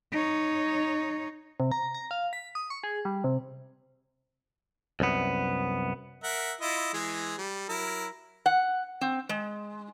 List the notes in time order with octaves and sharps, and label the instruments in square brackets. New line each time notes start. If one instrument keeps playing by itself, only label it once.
[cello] D#4 C#5
[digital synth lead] C3
A#5
A#5
F5
B6
D#6
C#6
G#4
G3
C3
[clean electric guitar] C2 F#2 B3
[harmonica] A#4 E5 F#5
E4 F4 D#5
E3 G#3 G#4
G3
F#3 E4 A#4
[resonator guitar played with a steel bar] F#5
C4
G#3